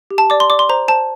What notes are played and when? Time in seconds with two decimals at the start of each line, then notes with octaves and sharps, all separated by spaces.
0.11 G4
0.18 A5
0.30 D5 D6
0.40 C6
0.50 D5 D6
0.59 C6
0.69 C5 A#5
0.88 C5 A5